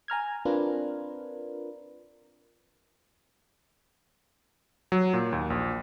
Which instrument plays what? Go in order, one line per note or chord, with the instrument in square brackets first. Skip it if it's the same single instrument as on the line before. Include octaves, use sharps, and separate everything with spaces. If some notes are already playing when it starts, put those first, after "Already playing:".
[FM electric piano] G#5 A#5 F6 G#6
C4 D4 F4 A#4 B4
[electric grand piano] F#3
A#2
D#2
A#1